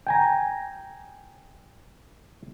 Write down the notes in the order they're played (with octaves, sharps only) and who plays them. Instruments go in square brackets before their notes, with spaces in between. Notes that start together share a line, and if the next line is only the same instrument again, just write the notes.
[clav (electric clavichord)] G5 G#5 A#5